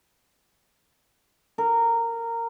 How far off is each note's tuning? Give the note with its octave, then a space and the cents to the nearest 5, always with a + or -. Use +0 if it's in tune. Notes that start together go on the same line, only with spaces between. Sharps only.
A#4 -15